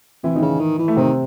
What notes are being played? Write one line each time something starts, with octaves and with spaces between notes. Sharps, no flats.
C3 E3 E4
D#3 D#4
C#3
D#3
E3
A3
C3 D#3 C4